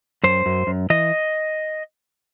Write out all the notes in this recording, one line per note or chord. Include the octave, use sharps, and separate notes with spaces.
F#2 C5
F#2
F#2
E3 D#5